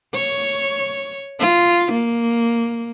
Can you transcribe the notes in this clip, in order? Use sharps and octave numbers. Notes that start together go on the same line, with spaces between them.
C#5
F4
A#3